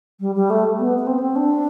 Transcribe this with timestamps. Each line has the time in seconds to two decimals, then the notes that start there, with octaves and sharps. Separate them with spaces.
0.20 G3
0.35 G3
0.50 A3
0.79 B3
0.98 B3
1.07 C4
1.18 B3
1.21 C4
1.36 D4